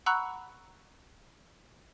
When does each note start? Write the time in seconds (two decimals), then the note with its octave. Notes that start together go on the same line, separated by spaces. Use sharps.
0.06 F#5 A#5 B5 C#6 E6 F#6